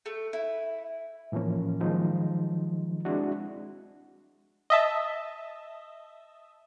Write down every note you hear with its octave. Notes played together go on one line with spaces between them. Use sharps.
A3
E4
A2 E3 F3 A#3 C#4
D#3 F3 F#3 G#3 D#4
G#3 C4 D4 E4 F#4
D#5 E5 A5